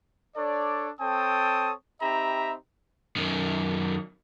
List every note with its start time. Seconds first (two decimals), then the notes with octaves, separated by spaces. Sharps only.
0.36 D4 A4 C#5 D5
1.01 C4 A4 C#5 G5 A5 D#6
2.02 C4 D#4 G4 E5 A#5 B5
3.16 F#2 D#3